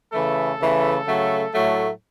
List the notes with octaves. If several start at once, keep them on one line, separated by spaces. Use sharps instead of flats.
C#3 E3 A3 A4
C#3 E3 A3
C#3 F#3 A3
A2 F#3 A3